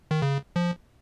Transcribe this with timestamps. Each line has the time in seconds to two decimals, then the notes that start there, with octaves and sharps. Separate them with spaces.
0.11 D#3
0.22 C#3
0.56 F3